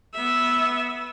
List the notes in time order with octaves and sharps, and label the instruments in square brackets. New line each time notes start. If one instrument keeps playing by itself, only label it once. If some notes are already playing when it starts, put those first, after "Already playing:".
[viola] B3 E5